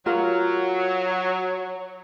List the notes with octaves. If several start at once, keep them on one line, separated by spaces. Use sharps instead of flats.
F#3 F4 A#4